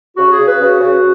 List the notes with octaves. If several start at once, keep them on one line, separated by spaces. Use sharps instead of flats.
C#3 F#4
G#4
C#3
B4
C#3 F#4
C#3